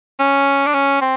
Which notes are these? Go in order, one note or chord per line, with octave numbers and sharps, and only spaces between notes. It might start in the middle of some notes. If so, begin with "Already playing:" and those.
C#4
D4
C#4
C4